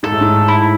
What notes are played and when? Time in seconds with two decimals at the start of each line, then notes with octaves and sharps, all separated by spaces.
0.03 G#2 A4
0.12 A2
0.21 G#2
0.48 E4